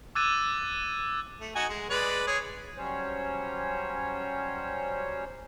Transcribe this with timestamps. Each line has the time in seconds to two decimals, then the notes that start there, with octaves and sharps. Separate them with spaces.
0.15 D6 E6 F#6 G#6 A6 D#7
1.40 A3
1.55 D#4 F#4 G#5
1.69 G#3
1.90 G#3 B4 D5
2.27 G#4 C#5
2.77 F#3 G3 C#4 C5 C#5